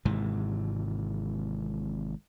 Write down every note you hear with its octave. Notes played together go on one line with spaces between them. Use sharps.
G#1 G#2 C3 E3